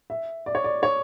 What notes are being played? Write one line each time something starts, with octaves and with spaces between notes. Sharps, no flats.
E5
D5
C#5
D5
C#5